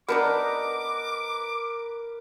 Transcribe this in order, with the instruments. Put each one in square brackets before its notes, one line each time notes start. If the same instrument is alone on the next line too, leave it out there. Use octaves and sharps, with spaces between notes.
[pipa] B3 D4 D#4 [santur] A#4 B4 [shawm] D6